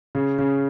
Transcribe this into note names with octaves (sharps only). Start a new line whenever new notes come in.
C#3
C#3